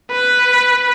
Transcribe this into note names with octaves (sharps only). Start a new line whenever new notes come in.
B4